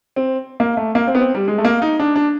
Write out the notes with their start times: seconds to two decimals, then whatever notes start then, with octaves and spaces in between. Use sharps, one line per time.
0.16 C4
0.60 A#3
0.77 A3
0.95 A#3
1.07 C4
1.15 B3
1.20 C4
1.35 G3
1.48 G#3
1.58 A3
1.65 A#3
1.82 D#4
2.00 D4
2.16 D4